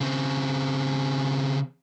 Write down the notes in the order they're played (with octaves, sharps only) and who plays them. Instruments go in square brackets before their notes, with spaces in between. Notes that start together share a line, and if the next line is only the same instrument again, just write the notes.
[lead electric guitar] C#3 C4